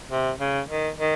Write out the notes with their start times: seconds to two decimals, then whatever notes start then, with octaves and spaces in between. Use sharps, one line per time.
0.11 C3
0.40 C#3
0.69 D#3
0.98 D#3